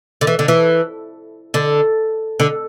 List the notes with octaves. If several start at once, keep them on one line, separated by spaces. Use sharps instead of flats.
D3
E3
D3
E3
D3
D3